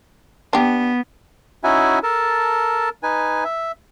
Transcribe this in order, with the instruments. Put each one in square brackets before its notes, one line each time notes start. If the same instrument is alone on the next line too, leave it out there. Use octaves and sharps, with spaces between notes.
[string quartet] B3 [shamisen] D4 G4
[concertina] C#4 D#4 E4 F#4 E5 G#5
A4 A#4 A5
D#4 B4 G#5
E5